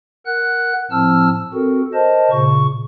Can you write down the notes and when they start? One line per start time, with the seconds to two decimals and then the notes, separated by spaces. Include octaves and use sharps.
0.26 A#4 F#5 F#6
0.91 A2 F3 C4 A5 E6 F6
1.53 C4 F#4 A4 A#4
1.94 A#4 C5 D#5 A5
2.31 A#2 C#3 C#6